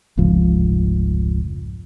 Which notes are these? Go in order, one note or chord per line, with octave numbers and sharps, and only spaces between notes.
F1 C#2 G#2 F3